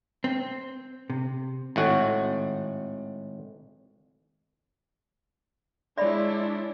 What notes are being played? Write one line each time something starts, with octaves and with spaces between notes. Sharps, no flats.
C4
C3
G#1 A2 F#4
G#3 D4 E4 C#5 D5 E5 B5 C6